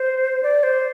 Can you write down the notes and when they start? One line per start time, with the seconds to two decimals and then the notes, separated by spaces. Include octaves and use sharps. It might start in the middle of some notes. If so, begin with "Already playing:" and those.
Already playing: C5
0.43 D5
0.63 C5